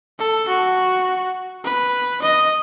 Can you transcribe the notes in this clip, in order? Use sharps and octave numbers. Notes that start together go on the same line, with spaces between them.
A4
F#4
B4
D#5